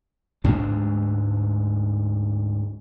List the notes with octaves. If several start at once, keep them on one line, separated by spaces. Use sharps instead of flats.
D2 G#2 G#3 D4